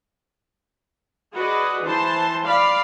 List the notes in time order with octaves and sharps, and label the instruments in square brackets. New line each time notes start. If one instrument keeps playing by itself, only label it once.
[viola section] F#4 G#4 B4 D5 D#5
E3 C5 A5 C6
D5 F5 B5